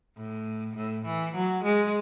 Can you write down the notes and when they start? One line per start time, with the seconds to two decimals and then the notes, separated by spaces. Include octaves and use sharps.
0.17 A2
0.76 A2
1.05 E3
1.35 F#3
1.64 G#3